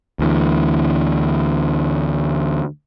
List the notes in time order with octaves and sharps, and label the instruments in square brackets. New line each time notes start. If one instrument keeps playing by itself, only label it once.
[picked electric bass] D2 E3